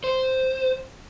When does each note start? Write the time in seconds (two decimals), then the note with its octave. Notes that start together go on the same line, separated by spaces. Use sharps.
0.04 C5